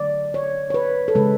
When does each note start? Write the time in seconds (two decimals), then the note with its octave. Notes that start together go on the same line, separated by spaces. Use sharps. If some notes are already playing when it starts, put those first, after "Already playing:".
Already playing: D3 F#3 A3 D5
0.34 C#5
0.70 C#5
0.74 B4
1.08 A4
1.15 C#3 G#3 B4